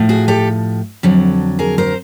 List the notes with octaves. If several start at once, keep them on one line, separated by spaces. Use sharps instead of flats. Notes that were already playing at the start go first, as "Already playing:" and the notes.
Already playing: A2 F3
F#4 G#4
G4 A4
F2 D3 F#3
G#4 A#4
A#4 C5